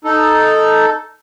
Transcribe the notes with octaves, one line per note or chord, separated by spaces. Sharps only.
D#4 A4